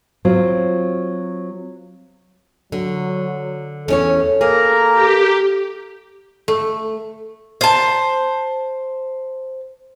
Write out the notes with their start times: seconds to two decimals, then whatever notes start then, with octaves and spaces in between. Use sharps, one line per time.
0.25 F#3 C4 F4 C5
2.72 D3 F#3
3.88 E2 C#4 A4 C#5
4.41 A#3 G#4 A#4 A#5
4.93 G4
6.48 A3
7.61 C5 A5